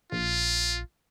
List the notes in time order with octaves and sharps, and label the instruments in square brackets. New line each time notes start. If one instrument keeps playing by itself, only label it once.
[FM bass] A#1 [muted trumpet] F4